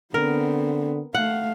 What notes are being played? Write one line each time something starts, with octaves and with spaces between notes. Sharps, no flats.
D3 B3 C4 A#4
A3 F5 F#5